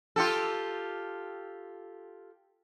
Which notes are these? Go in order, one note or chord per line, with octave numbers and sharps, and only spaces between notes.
F4 G4 A4